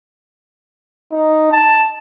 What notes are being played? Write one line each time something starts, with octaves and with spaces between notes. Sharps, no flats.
D#4
A5